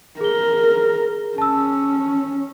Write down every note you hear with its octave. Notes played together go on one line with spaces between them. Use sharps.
G#4 A#4 G7
C#4 A5 E6